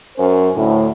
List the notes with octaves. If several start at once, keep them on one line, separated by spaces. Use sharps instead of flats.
F#2 C#4 A#4 C5
D2 A2